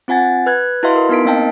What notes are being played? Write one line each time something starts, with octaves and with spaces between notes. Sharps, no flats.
C4 F4 F#5 G#5 A6
B4 F#6 G#6
E4 F#4 B4 D#5 F5 C6
A#4
B3 D#4 A#4 B6 D7
A#3 C4 D#5 F5 G5 A5